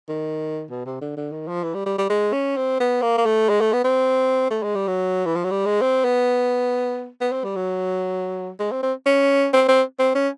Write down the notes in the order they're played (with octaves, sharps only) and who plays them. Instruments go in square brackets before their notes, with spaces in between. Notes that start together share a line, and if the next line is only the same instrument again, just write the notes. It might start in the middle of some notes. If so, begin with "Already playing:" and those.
[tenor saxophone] D#3
B2
C3
D3
D3
D#3
F3
E3
G3
G3
G3
G#3
C#4
C4
B3
A#3
A#3
A3
G#3
A3
B3
C4
A3
G#3
G3
F#3
E3
F3
F#3
G3
G#3
C4
B3
B3
C4
G3
F#3
G#3
C4
C4
C#4
C4
C4
C4
C#4